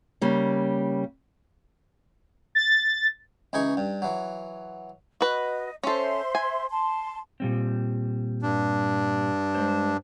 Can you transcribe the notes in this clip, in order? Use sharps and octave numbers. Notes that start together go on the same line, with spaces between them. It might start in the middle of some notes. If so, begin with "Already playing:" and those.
C#3 G3 A#3
A6
C#2 E3 D#4 G#4 C#6
G2
E3 F#3
F#4 B4 D#5
C#4 A4 C5 E5 C6
G#5
A5 C6
A#2 G3 C4
G2 D4
G#3 C5